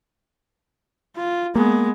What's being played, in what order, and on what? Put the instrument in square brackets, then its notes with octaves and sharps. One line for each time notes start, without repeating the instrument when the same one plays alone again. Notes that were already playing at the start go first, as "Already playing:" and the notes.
[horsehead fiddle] F4
[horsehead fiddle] G#3 B3 [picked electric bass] A#3